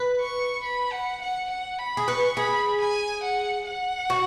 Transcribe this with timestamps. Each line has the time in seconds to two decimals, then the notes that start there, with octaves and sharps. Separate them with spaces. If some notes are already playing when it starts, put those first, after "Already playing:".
Already playing: B4
0.21 C#6
0.64 B5
0.93 F#5
1.22 F#5
1.50 F#5
1.79 B5
1.97 G#4
2.08 B4 C#6
2.37 G#4 B5
2.81 G#5
3.24 F#5
3.67 F#5
4.10 F#4